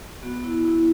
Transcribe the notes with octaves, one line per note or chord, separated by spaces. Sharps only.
B3 F#4
E4
E4